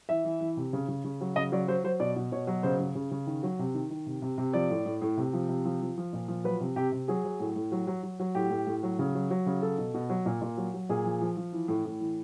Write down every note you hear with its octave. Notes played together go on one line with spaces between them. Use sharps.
E3 E5
E3
E3
C3
C#3
C#3
C#3
F#3
C#3 D#5
F#3 D5
F#3 C5
F#3 C5
B2 D5
B2
B2 C#5
F#3
C#3 C5
C#3
C#3
C#3
D#3
F#3
C3
D#3
D#3
C3
C3
C3
F3 D5
A2
A2
A2
C3
F3
C3
F3
F3
F3
A#2
F3
F#3 B4
C3
C3 G4
C3
F#3 G#4
F#3
A2
A2
F#3
F#3
F#3
F#3
A2 G4
A2
A2
F#3
C#3
F#3
F#3
C#3
F#3 A4
B2
B2
F#3
A#2
A#2
F#3
F#3
A#2 G#4
F3
F3
F3
E3
A2
A2
E3